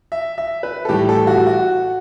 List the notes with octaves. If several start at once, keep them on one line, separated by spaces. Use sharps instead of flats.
E5
E5
B4
A4
A2 E3 G3 G4
A4
F#4
F#4